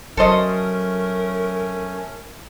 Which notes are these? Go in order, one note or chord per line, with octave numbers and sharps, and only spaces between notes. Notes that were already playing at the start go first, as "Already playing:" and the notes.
F#3 A3 C#4 A4 A#4 C5 D#5